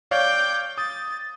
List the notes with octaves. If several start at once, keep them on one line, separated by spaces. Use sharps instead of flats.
C#5 D5 F5 G5 D6
D#6 A6